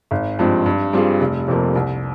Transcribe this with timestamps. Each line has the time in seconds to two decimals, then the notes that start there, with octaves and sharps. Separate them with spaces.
0.11 G#1
0.39 G2 F3 G#3 C4
0.66 G2
0.93 G3 C4 F4 G#4
1.20 F1
1.48 F2 C3 F3 A#3
1.76 C2